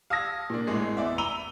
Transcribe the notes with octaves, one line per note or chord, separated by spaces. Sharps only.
F5 A5 D#6 E6 G#6 A#6
A#2 A#3 D4
G#1 A2 G#3 G#4
E2 D5 E5
A#5 B5 E6 D#7 F7 G7